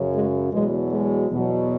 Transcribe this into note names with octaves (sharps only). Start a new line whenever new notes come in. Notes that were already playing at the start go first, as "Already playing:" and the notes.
Already playing: F#2 C#3 F#3
G#3
E2 B2 F#3 G#3
G#3
E2 B2 F#3